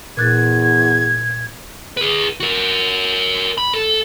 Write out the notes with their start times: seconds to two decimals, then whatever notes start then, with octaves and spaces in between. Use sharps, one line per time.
0.17 E2 A#2 F#6 G#6 A6
1.97 G#4 B4
2.40 F#4 A#4
3.58 B5
3.74 A4